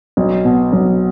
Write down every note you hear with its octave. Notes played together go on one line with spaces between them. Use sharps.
B1
B2
B1